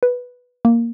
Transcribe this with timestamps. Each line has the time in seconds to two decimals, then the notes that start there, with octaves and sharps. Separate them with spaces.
0.03 B4
0.65 A#3